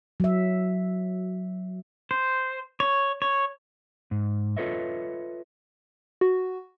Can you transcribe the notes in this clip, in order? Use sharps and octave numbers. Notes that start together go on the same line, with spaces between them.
F#3 E5
C5
C#5
C#5
G#2
F4 A4 B4 C#5 D#5 E5
F#4